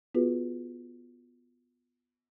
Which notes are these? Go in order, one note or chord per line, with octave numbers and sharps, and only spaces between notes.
B3 F4 F#4 G#4 B4